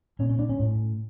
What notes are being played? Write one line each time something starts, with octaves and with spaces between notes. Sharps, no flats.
A#2 C#4
C#4
D4
C#4
A2